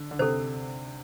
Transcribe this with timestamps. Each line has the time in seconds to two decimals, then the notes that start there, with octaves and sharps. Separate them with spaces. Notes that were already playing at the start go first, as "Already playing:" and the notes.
Already playing: D3
0.11 D3
0.19 C3 A4 C5